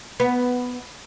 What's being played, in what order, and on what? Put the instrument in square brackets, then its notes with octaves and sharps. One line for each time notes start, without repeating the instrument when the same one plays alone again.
[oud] B3